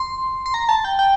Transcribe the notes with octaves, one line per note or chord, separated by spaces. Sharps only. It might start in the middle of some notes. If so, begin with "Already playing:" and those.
Already playing: C6
C6
A#5
A5
G5
G5